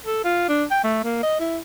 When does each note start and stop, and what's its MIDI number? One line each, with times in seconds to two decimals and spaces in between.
0.06 0.22 69
0.24 0.44 65
0.49 0.64 62
0.71 0.82 79
0.84 1.02 57
1.04 1.22 58
1.23 1.40 75
1.40 1.58 64